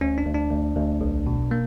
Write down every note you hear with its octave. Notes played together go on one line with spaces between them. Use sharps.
D2 C#4
D4
D2
D4
D2
D2
B1
B2
A#3